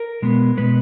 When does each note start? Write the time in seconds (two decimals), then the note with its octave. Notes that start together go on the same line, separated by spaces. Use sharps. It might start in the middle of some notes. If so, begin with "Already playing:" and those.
Already playing: A#4
0.22 B2 G#3 B3
0.57 B2 G#3 B3 B4